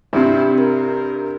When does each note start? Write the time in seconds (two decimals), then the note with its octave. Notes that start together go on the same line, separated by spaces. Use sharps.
0.13 G2 C3 E4
0.59 A#4